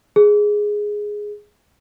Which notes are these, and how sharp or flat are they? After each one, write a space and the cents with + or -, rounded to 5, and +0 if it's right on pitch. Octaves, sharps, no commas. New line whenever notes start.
G#4 +0